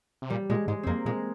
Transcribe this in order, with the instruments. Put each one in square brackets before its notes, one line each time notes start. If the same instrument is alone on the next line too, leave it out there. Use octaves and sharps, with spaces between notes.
[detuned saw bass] C3
[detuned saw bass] A#2 [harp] G3
[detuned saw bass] A#2 [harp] G#3
[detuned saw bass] G#2 [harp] G#3
[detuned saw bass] F2 [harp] A#3 C4
[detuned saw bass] A#2 [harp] G#3